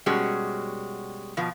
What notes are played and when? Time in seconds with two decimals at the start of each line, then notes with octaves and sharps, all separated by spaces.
0.06 B2 G3 G#3 C#4 F#4
1.37 B2 F3